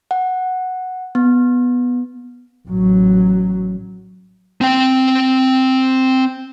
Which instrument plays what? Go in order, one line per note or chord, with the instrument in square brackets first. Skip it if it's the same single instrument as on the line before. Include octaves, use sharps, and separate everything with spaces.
[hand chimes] F#5
B3
[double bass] A1 F#3
[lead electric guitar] C4 G5